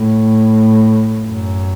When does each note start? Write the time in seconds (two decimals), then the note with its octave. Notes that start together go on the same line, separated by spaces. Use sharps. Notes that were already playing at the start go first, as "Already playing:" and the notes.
Already playing: A2
1.24 F#2